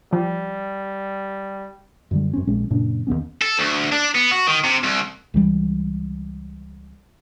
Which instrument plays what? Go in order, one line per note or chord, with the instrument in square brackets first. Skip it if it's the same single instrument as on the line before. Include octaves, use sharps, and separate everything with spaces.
[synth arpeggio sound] F3 [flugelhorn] G3
[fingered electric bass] F#2 D3 G3
F#2 C4 C#4
A#1 C3 G#3 C#4
F#2 A#2 C#3 D4
D#2 B2 B3 C#4
[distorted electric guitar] A4
D2
D4
B3
F#4
D#3
C3
C2
[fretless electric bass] C#2 E3 F3 G3